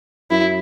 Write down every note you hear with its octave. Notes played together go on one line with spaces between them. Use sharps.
F#2 E4